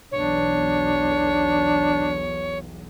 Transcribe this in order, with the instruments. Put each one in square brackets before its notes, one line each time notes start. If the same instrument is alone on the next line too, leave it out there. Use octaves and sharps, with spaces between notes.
[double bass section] B1 E2 [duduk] D4 [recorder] C#5